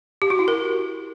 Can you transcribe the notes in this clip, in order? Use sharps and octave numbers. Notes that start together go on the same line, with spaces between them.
G4
F#4
E4
A#4